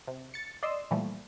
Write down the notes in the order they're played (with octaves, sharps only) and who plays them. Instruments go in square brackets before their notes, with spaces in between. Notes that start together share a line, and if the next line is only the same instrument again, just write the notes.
[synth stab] C3
A6 C#7
D5 D#5 C6 E6
A#2 E3 F3 G3 A3